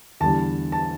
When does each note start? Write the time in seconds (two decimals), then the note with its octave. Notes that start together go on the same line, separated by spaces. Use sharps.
0.20 E2 D3 G3 A5
0.72 A5